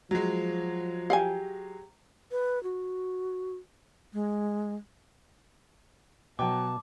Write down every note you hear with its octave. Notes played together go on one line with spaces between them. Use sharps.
F3 F#3 G#3
G4 F5 F#5 G#5
B4
F#4
G#3
B2 F#3 G5 A5 D6